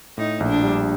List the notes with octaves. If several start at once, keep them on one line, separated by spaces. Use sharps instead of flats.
A2 D#4
A#1
D4
G3